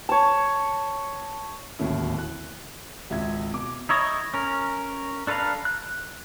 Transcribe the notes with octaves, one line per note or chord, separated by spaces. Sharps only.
C#5 A5
D1 G#1 D#2 A3 C#4 E4
F#6
G#1 C#2 E5 G#6
B2 D6
D#4 E4 C#5 D#5
C#4 A#4
D4 A4 B4 F5 A#5
F#6